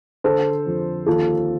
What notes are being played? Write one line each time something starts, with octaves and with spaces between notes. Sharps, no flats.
D3 A4 C5
F2
D#2 F4 A4